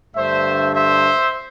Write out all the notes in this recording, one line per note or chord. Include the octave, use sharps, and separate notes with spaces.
G2 D3 A3 C5 E5
C5 E5